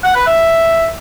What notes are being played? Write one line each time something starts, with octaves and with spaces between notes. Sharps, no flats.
F#5
B4
E5